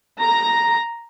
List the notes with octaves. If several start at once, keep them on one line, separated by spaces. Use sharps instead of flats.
A#5